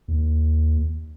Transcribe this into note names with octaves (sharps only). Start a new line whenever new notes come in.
D#2